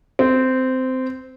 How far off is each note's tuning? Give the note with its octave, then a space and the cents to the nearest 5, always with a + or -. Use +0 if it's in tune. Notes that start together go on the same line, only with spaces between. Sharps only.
C4 -15